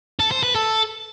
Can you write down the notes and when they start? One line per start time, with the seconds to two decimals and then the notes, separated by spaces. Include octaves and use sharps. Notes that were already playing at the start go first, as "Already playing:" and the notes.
0.20 A4
0.32 C5
0.43 B4
0.55 A4